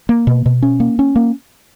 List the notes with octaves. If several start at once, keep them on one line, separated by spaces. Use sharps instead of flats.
A#3
B2
B2
C#4
A#3
C#4
A#3